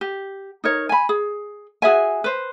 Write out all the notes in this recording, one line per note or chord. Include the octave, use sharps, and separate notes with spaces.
G4
D#4 A#4 C#5
G#5 B5
G#4
F#4 G#4 E5 G#5
B4 C5